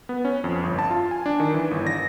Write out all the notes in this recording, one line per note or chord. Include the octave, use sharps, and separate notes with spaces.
B3
C#4
F2
G1
A5
F4
G#5
D4
D#3
E3
G1
A#6